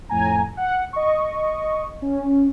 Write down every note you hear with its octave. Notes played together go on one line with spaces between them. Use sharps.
F2 A2 G#5 A#5
F#5
D#5 C#6
C#4